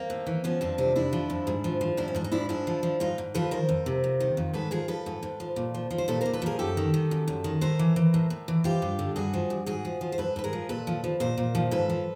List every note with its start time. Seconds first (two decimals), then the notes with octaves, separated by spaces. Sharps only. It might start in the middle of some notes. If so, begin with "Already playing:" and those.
Already playing: A#3 C4
0.10 A2
0.27 E3
0.44 F3 B3 C#4
0.61 F2 C4 D4
0.78 C3 D4 E4
0.96 F2 D4 E4
1.13 F3
1.30 F2
1.47 G#2
1.64 F3
1.81 F3
1.97 G#2 D4 E4
2.08 C#4
2.15 G#2 D4
2.24 D#4
2.32 F3 D4 E4
2.49 G#2 D4 E4
2.67 F3
2.83 F3
3.00 G#2 D#4 F4
3.18 G#2
3.34 F3 A4 B4
3.51 D#3 A#4 C5
3.69 F2
3.86 C3
4.04 F2
4.20 D#3
4.37 F2
4.53 G#2 A4 B4
4.71 F3 G#4 A#4
4.88 F3 A4 B4
5.06 G#2
5.23 G#2
5.40 F3
5.56 A#2
5.74 F3
5.90 F3
5.98 C5
6.08 A#2 A4 B4
6.21 A#2 A#4 C5
6.33 A4 B4
6.42 F3 G#4 A#4
6.59 F#2 G4 A4
6.77 D#3
6.94 D#3
7.11 F#2
7.28 F#2
7.44 D#3
7.61 A2 A#4 C5
7.79 E3
7.96 E3
8.14 A2
8.30 A2
8.48 E3
8.64 F3 F4 G4
8.82 G2
8.99 D3
9.16 G2 F#4 G#4
9.33 F3
9.50 G2
9.66 G#2 F#4 G#4
9.85 F3
10.01 F3
10.12 C5
10.18 G#2 A4 B4
10.36 G#2 B4
10.44 G#4 A#4
10.53 F3
10.69 A#2 A4 B4
10.87 F3
11.04 F3
11.20 A#2 A#4 C5
11.38 A#2
11.55 F3
11.71 G#2 A4 B4
11.90 F3